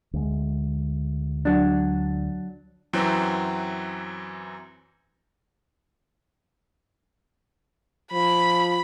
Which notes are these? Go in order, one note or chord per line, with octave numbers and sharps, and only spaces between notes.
D2 G#3
F#3 D4
F#2 E3 F#3 C4
F3 B5